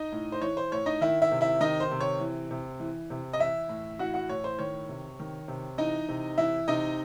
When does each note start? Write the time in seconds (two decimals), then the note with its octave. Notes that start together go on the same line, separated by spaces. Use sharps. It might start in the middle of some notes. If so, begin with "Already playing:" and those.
Already playing: D#4 D#5
0.12 A2
0.32 C5
0.41 E3 C#5
0.57 C5
0.72 A2 C#5
0.86 D#4 D#5
1.01 D#3 E4 E5
1.22 E4 E5
1.32 C3
1.41 E4 E5
1.60 D#3 D#4 D#5
1.80 C5
1.91 C3
2.00 C#5
2.20 E3
2.51 C3
2.80 E3
3.10 C3
3.33 D#5
3.39 E3 E4 E5
3.69 A2
3.99 E3 F#4 F#5
4.14 F#4 F#5
4.29 A2 C#5
4.44 C5
4.59 D#3 C#5
4.89 C3
5.20 D#3
5.48 C3
5.78 E3 D#4 D#5
6.09 C3
6.38 E3 E4 E5
6.68 C3 D#4 D#5